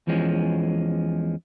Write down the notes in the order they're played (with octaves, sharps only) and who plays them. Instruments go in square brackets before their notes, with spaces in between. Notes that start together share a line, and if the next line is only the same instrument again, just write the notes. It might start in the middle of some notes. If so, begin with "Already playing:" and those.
[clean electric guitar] E2 E3 F3 G#3 C#4